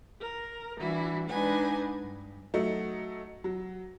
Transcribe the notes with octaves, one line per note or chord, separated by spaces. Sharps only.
A#4
E3 G3 D4 E4 F#4
G#3 D4 D#4 B4 F#5 G#5
G2
F#3 A3 D#4
F#3